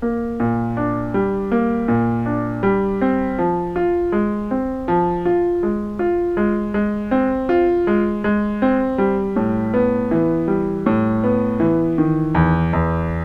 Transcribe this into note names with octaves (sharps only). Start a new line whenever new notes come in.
A#3
A#2
D4
G3
A#3
A#2
D4
G3
C4
F3
F4
G#3
C4
F3
F4
G#3
F4
G#3
G#3
C4
F4
G#3
G#3
C4
G3
A2
B3
E3
G3
A2
B3
E3
D#3
E2
E2